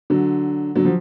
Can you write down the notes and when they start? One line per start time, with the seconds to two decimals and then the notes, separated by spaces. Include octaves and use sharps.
0.10 D3 F#3
0.76 D3 F#3
0.85 F3